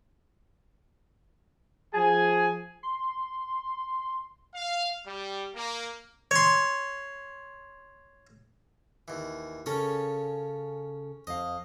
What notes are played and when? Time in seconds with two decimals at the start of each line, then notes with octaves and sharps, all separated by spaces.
1.93 F3 G#4 G#5
2.83 C6
4.55 F5
5.06 G3
5.55 A#3
6.31 C#5 C6
9.08 D#2 E3
9.66 C#3 C#4 A4 A#4 C#5
11.27 F2 D#5 F5